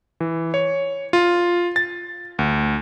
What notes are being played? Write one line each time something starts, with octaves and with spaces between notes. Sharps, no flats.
E3
C#5
F4
A6
D2